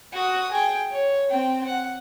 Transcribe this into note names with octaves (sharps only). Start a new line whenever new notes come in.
F#4 D#6
G#4 G5
C#5
C4 G5
F#5